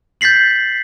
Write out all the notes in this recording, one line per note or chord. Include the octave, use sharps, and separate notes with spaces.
G6 A6 B6 C7 F#7